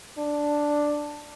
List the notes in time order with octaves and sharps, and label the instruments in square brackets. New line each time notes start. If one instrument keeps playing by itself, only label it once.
[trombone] D4